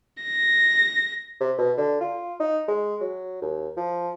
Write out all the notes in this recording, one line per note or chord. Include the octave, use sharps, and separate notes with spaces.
A#6
C3
B2
D3
F4
D#4
G#3
F#3
D#2
F3